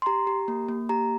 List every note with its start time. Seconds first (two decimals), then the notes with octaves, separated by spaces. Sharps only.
0.02 C6
0.06 G4 A#5
0.27 G4
0.48 A#3
0.68 A#3
0.89 G4 A#5